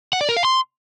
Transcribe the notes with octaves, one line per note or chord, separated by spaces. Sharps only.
F#5
D5
A#4
F5
C6